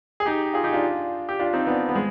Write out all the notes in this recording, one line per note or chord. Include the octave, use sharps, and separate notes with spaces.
G#4
D#4 G4
F4 G#4
D#4 G4
D4 F4
G4
D4 F4
C4 D#4
B3 D4
B3
G#3